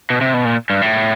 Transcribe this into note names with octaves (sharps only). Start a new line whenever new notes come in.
B2
C3
B2
A#2
G2
A2